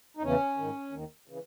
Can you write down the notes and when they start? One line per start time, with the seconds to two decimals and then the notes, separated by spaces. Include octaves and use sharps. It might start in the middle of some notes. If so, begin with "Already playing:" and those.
0.17 D#4
0.22 E2 C#3 E3 C#4
0.57 G#2 D#3
0.92 D#2 D#3
1.28 C#3 E3